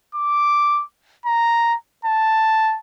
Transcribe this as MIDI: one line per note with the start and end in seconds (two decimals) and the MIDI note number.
0.15 0.83 86
1.26 1.75 82
2.05 2.77 81